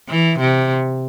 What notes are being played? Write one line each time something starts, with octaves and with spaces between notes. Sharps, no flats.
E3
C3